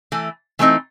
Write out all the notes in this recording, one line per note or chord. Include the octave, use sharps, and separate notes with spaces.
E3 A3
E3 A3 C4 D#4